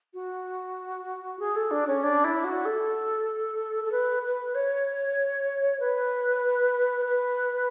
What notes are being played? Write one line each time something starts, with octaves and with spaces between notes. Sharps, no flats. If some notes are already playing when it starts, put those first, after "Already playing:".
F#4
G#4
A4
D4
C#4
D4
E4
F#4
A4
A4
B4
B4
C#5
B4
B4